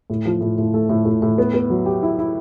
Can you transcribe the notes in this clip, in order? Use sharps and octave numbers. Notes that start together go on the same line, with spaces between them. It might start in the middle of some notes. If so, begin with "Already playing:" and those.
A2
F3
A2
A2
A3
A2
A2
A2
B3
B3
F#3
G4
E4
E4